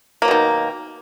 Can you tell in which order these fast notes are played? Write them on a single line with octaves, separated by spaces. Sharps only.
A#3 F#3 B2 D#3